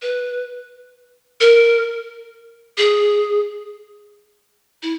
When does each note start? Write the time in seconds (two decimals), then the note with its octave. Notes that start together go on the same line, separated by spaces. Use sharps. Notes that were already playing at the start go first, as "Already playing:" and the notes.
0.02 B4
1.41 A#4
2.78 G#4
4.83 E4